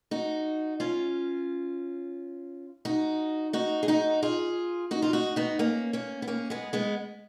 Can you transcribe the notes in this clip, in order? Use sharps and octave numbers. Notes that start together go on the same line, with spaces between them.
D#4 F#4
C#4 F4
D#4 F#4
D#4 F#4
G#4
D#4 F#4
F4 G#4
D#4 F#4
F4
D#4 F#4
B3 D#4
A#3 C#4
A#3 C#4
B3
A#3 C#4
G#3 B3
G#3 B3